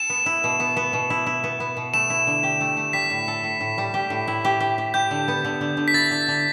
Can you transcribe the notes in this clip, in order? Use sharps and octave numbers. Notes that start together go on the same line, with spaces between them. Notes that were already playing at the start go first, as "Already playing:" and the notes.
Already playing: A4 E7
B3
E4
B2
B3
B3
B2
E4
E4
B3
B3
B2
A3 E7
E4
D3
G4
A3
A3
G3 B6
A2
A4
A2
A2
G3
G4
A2
E4
G4
G4
G4
G4 G6
D3
B3
D3
D3
D3
B6
E4 A6
D3
D3